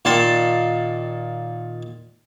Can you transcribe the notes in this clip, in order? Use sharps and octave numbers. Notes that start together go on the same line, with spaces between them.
A#2 D#3 A5 C6